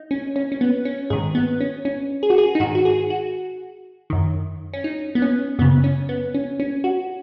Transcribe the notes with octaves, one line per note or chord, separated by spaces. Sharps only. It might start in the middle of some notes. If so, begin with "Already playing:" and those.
Already playing: D#4
C#4
C#4
C#4
B3
C#4
G#2 D#3 G#4
B3
C#4
C#4
G#4
F#4
G#4
D#4
G#2 D#3 F#4
F#4
G#4
F#4
F#2 D#3
C#4
D#4
B3
C#4
F#2 C#3 B3
C#4
B3
C#4
C#4
F#4